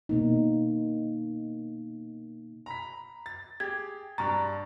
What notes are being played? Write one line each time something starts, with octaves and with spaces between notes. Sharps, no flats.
B2 A#3 D#4
A#5 B5 B6
A6
G4 G#4 G#6
G2 A#5 C#6 A6